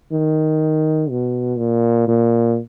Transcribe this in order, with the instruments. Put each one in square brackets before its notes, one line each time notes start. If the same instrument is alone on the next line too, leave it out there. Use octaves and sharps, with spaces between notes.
[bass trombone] D#3
B2
A#2
A#2